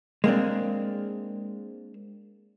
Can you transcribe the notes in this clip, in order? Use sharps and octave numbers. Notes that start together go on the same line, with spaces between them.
G#3 A#3 C4 D4